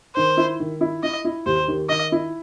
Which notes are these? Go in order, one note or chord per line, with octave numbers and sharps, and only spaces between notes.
D#3 C5
E4
D#3
E4
E4 D#5
E4
D#2 C5
D#3
D#3 D#5
E4